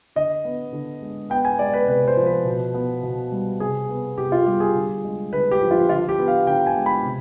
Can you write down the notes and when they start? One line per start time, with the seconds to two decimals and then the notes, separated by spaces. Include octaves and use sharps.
0.16 D3 D#5
0.45 B3
0.73 D3
1.02 G#3
1.30 B3 G5
1.45 G#5
1.59 G#3 D5
1.73 B4
1.88 C3 B4
2.08 C5
2.17 F3
2.26 B4
2.45 B2
2.74 B3
3.03 B2
3.32 G3
3.60 C3 G#4
3.89 B3
4.18 C3 G4
4.32 F4
4.46 G3 G4
4.60 G#4
4.75 D3
5.04 G#3
5.33 D3 B4
5.51 G4
5.61 F3
5.71 F4
5.89 D3 F4
6.09 G4
6.19 B3
6.28 F5
6.47 D3 G5
6.66 G#5
6.77 G#3
6.86 B5
7.05 C3